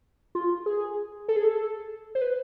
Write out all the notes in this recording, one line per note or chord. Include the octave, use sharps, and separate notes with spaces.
F4
G#4
A4
G#4
A4
C5
B4